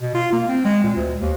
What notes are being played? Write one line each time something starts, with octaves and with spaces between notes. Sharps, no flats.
B2
F4
A#3
C4
G#3
A#2
D2
D#2